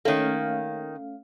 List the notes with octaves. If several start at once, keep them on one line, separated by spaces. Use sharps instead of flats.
D#3 A3 A#3 C#4 F5